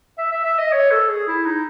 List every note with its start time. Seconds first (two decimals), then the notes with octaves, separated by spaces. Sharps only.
0.18 E5
0.32 E5
0.44 E5
0.59 D#5
0.72 C#5
0.91 A4
1.09 G#4
1.27 E4
1.46 D#4